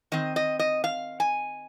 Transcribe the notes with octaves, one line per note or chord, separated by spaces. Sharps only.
D#3 C4 D#5
D#5
D#5
F5
G#5